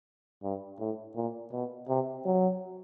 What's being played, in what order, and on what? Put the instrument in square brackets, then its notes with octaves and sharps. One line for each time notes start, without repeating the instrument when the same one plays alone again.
[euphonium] G2
A2
A#2
B2
C3
F#3